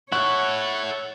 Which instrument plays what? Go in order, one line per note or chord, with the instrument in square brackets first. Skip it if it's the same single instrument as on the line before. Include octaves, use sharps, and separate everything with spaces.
[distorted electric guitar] E4 A4 [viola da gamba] C#5 [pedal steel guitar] F#5 [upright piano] C#6 F#6